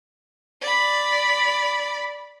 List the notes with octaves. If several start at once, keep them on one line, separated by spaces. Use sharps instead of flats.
D5 B5